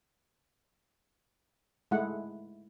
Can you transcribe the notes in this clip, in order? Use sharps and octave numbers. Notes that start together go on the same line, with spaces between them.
G#3 A3 E4 F#5